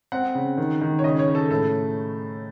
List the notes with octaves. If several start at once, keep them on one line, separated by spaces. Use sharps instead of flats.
C4 F#5
C#3
D#3
D#3
C#5
C#3 D#5
C#5
C#3
A4
A2 A4